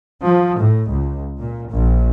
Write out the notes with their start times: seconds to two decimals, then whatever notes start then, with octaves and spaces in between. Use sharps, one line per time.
0.23 F3
0.59 A2
0.89 C#2
1.38 A#2
1.71 A#1